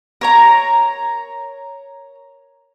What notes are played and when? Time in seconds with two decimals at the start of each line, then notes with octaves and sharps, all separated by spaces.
0.21 A#4 C#5 A#5